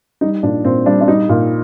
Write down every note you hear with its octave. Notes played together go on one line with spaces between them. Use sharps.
G3 D#4
A#2 D4
A#2 C4
G3 D4
D4
G3 D#4
A#2